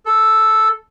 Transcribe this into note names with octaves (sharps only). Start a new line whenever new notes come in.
A4